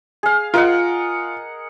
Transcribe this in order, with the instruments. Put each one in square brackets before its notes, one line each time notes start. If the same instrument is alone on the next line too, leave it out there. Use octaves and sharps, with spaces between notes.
[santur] G#4 F5
[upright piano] F4 [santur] A#4 D#5 F#5